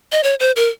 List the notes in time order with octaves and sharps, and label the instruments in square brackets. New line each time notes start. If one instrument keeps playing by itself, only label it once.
[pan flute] D#5
C#5
C5
A#4